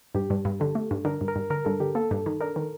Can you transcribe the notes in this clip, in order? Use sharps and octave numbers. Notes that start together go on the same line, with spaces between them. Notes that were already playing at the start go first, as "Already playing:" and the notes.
G2 G4
G2
G2
D3 A4
A3
G2
D3 A#4
G2
A#4
G2
D3 A#4
G2 A4
D3 G4
A#3 A4
G2
D#3
D4 A#4
D#3